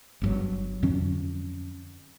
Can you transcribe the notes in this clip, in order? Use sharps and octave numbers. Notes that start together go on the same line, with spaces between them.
G1 G2 F#3
F2 D3 F#3 C#4